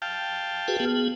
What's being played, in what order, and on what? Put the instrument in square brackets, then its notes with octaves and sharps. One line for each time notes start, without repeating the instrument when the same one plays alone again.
[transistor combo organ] F5 G5 A5
[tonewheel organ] F#4 G#4 B4
B3 G#4